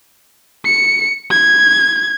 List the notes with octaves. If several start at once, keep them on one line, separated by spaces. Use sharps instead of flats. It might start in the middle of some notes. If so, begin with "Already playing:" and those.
C#7
G#6